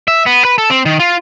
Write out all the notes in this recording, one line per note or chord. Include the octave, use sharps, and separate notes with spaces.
E5
B3
B4
A4
C4
D#3
F4